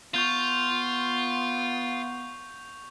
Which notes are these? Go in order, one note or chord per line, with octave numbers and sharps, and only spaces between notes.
B3 F4 C#6 G6 F7